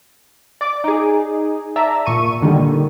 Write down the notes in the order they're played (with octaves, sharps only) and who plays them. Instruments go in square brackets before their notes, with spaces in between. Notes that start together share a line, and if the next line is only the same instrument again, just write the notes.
[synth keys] D5 D6
D#4 G#4
D5 E5 A5 A#5 E6
A#2 C#6 D#7
A#2 D3 D#3 G3